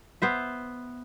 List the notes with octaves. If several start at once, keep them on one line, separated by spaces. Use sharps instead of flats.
B3 C5 E5